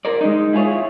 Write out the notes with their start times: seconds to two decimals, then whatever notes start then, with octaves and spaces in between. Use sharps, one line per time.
0.05 A#4 D5
0.21 G#3 D#4
0.53 E4 F4 G#4 A#4 C#5